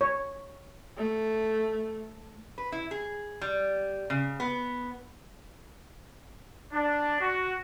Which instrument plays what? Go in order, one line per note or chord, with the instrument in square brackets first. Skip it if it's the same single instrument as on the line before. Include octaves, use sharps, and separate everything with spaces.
[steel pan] C#5
[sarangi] A3
[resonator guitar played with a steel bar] B4
E4
G#4
G3
C#3
B3
[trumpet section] D4
F#4